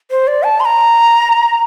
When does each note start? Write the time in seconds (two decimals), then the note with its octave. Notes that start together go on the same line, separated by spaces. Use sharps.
0.11 C5
0.27 D5
0.43 A5
0.60 C6
0.65 A#5